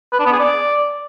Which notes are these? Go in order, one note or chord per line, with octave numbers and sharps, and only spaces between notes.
B4
D4
B3
G#4
D5